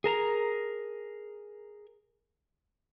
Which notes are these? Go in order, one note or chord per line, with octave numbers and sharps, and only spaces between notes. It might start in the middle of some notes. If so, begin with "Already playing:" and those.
G#4 A#4 A5 A#5